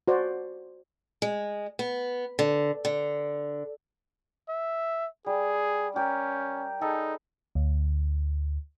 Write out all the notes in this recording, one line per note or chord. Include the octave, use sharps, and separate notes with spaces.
F#4 C5 D5
G#3
B3
D3
D3
E5
G3 G#4
C#4 G4 A#4
D#4 G#4 A4 B4
D2